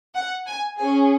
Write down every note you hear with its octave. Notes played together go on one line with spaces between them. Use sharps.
F#5
G#5
C#4 G#4 G#5